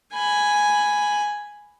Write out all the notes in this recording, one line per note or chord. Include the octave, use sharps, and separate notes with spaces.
G#5 B5